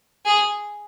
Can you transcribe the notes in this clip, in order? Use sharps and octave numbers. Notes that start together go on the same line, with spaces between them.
G#4